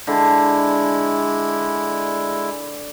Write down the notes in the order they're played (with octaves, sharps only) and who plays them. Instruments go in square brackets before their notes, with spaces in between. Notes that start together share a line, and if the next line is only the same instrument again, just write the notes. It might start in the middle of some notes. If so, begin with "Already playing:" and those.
[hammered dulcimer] D3 [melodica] G#3 E4